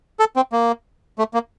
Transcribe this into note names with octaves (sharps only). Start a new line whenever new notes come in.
A4
C4
A#3
A3
A#3